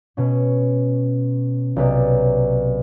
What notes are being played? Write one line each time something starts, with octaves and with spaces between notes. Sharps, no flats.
B2 C#4
B1 C3 B4 D5